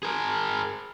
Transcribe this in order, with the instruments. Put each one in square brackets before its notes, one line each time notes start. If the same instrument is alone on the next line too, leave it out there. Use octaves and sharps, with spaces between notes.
[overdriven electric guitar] G#4 A#4